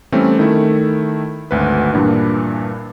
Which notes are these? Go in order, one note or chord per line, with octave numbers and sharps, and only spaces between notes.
E3 G3 A3 C4 C#4
D#3 A3 E4
G#1 D2 B4
G2 A#2 E3 D4